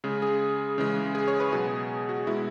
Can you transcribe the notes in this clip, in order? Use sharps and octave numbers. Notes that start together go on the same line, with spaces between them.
C#3 G#3 G#4
G#4
C#3 E3 G#3
G#4
C#5
B4
B2 F#3 G#4
F#4
B2 G#3 E4